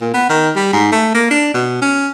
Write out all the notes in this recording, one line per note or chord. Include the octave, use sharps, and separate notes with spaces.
A#2
B3
D#3
G3
G#2
A3
A#3
D4
B2
C#4